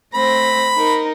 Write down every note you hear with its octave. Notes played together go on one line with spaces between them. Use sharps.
A3 C4 B5 A#6
D#4 A#4